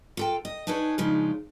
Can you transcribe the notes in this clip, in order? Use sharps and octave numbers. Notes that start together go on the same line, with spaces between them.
F4 A4 G5
D#5
D4 D#4 G#4 B4 C#5
C#3 F3 G#3 D4 D#4